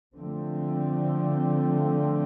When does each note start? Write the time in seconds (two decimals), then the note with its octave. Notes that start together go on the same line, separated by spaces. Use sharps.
0.17 D3 F3 A3 C4